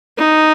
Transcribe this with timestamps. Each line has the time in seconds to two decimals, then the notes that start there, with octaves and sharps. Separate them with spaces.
0.18 D#4